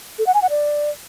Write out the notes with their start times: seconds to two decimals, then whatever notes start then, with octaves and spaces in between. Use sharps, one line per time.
0.18 A4
0.26 F#5
0.34 G#5
0.42 F#5
0.50 D5